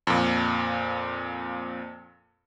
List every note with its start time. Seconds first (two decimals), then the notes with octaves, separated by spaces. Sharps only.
0.07 F2 A#2